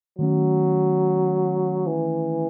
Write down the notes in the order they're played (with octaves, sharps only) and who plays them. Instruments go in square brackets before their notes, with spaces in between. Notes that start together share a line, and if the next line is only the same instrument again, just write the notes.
[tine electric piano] D#3 A3 C#4 [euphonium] F#3
[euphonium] E3